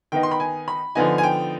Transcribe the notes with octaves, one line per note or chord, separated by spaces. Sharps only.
D#3 B3 D#4 G5
C6
B5
G#5
B5
D3 F3 B3 D#4 G#5
G#5
G5